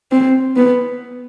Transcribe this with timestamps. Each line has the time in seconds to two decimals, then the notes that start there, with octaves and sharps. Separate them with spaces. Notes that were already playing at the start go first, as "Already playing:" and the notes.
0.12 C4
0.56 B3